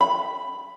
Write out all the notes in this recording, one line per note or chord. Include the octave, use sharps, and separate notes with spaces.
B5